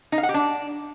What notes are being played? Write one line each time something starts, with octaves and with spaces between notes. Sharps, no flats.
D#4
F5
F#5
G4
D4